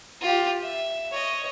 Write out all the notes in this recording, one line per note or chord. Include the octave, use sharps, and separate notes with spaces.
F4 G4
E5
C#5 D#5